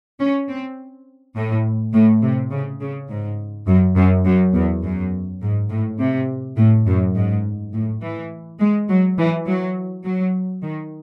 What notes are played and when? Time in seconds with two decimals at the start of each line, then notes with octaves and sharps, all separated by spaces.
0.19 C#4
0.49 C4
1.36 A2
1.94 A2
2.22 C3
2.52 C#3
2.81 C#3
3.09 G#2
3.67 F#2
3.96 F#2
4.25 F#2
4.54 E2
4.84 F#2
5.41 G#2
5.70 A2
6.00 C3
6.57 A2
6.86 F#2
7.15 G#2
7.73 A2
8.02 E3
8.60 G#3
8.89 F#3
9.18 E3
9.47 F#3
10.05 F#3
10.63 D#3